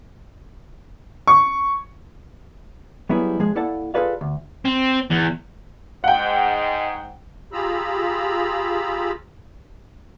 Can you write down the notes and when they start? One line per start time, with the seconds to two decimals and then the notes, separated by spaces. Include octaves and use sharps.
1.27 C#6
3.09 F#3 G3 B3 E4 G#4
3.39 F3 G#3 G#4
3.55 A#3 E4 A4 D5 F#5 A5
3.94 F4 G#4 A4 B4 D5 F5
4.21 D2
4.65 C4
5.10 E2
6.04 G#2 F#5 G5
7.53 F4 G4 G#4 A#5 B5 E6